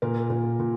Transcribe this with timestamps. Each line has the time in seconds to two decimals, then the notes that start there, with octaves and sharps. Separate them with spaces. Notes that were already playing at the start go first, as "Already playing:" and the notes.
0.02 A#2 A#4
0.30 A#2
0.60 A#2